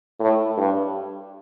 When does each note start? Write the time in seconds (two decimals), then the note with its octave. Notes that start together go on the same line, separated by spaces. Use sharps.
0.20 A2
0.57 G2